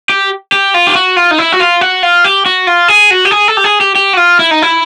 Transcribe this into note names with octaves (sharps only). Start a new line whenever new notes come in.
G4
G4
F4
G4
F#4
F4
D#4
E4
F#4
F4
F#4
F4
G4
F#4
F4
G#4
F#4
G4
G#4
A4
G4
G#4
G4
G4
F#4
F4
E4
D#4
E4